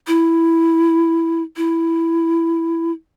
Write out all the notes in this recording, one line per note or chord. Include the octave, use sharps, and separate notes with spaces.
E4
E4